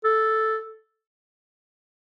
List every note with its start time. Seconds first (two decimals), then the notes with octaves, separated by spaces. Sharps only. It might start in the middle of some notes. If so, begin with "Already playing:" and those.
0.04 A4